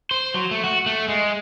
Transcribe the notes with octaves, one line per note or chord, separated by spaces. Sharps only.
C5
F#3
A3
F#4
A3
G#3